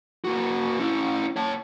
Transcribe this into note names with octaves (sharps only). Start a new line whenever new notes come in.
A#3 F#4
C#4 E4
C#5 A5